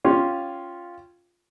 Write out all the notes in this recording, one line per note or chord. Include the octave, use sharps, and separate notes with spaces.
C#4 F4 G4 F5